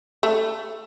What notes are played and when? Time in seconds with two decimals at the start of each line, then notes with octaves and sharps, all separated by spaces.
0.23 A3